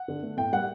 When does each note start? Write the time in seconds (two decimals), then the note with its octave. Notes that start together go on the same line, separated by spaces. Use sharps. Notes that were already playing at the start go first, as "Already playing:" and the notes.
Already playing: F#5
0.08 D3
0.23 A3
0.37 A2 G5
0.53 G3 A#3 F#5